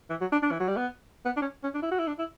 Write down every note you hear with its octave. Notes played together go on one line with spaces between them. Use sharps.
E3
F#3
D4
D4
E3
F#3
G3
B3
B3
D4
C#4
C#4
D4
E4
F#4
E4
D4
E4